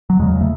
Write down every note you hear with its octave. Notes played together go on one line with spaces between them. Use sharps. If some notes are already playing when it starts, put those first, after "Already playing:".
F#3
E2 C#3 G#3
A3